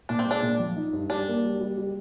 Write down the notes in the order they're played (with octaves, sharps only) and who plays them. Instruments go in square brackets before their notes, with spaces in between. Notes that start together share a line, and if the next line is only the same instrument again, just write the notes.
[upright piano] A#2 [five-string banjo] D4
[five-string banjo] C4
[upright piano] G#3 [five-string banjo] D4
[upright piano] A#2
F3
D#4
G2
[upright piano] G3 [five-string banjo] D4
[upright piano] A#3
G3
G3
G3